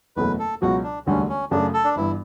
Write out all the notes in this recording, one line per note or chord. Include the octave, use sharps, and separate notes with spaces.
F#1 E2 B2 F#3 A3 B4
A4
C#2 B2 F#3 F#4
D4
E1 D2 D3 G3 C#4
C#4
F#2 C#3 F#3 A3 C#4 D4
A4
D4
G1 G2 E3 E4